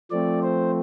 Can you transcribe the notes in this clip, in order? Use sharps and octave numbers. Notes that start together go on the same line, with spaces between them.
F3 A3 C4 D5
C5